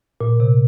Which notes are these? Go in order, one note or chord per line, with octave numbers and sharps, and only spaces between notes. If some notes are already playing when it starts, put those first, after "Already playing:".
A#2
C3